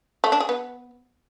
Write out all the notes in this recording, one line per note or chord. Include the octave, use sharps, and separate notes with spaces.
A3
D4
G#4
B3